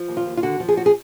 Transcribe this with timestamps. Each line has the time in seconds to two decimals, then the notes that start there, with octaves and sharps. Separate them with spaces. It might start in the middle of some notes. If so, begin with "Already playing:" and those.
Already playing: F3
0.08 D#2
0.17 F4
0.26 D#2
0.37 F4
0.43 D3 F#4
0.60 F3
0.68 G#4
0.77 F#4
0.86 G#4